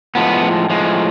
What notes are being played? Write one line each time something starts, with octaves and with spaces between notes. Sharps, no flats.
A2 F3 G#3 B3
A2 F3 G#3